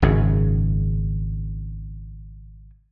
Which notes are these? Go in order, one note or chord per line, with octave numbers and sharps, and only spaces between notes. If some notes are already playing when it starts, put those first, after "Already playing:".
G#1 F#2 C#3